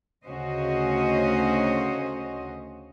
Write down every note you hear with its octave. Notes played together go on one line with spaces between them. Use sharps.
D2 C#3 C#4 F#4 C5 D#5